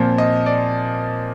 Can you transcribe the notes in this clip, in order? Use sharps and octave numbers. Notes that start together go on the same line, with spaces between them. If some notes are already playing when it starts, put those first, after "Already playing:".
Already playing: A#2 F3 C4
D#5
D5